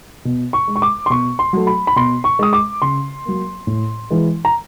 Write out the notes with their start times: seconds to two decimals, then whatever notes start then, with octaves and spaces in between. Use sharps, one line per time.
0.25 B2
0.53 C#6
0.68 G#3
0.76 C#6
0.82 D6
1.06 C6
1.10 B2 C#6
1.39 C6
1.53 F#3 A3
1.67 B5
1.87 B5
1.96 B2 C6
2.24 C#6
2.39 G#3 D#6
2.53 D6
2.82 C#3 C6
3.25 F#3 A#3
3.67 A2
4.10 E3 G#3
4.45 A#5